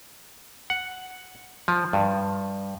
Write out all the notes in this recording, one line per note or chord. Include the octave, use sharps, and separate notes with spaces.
F#5
F3
G2